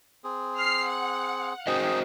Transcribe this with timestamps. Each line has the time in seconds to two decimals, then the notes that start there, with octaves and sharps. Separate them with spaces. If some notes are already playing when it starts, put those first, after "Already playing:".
0.24 C4 G#4
0.58 F6 C7
0.88 F#5
1.67 D#4 F#4 G#4 C5 D#5 G5